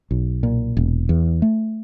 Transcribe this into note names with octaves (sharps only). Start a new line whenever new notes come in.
B1
A#2
E1
E2
A3